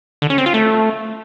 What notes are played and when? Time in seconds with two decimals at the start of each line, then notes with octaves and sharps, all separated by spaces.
0.22 D3
0.30 C#4
0.38 C4
0.46 F4
0.54 A3